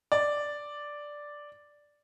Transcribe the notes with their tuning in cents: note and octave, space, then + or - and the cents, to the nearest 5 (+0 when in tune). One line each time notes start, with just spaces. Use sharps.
D5 +0